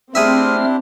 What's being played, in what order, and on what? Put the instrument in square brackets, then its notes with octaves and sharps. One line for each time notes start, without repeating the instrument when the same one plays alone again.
[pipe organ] A3 F6 [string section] C4 [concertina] D4 E4 G4 [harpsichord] G#4 E5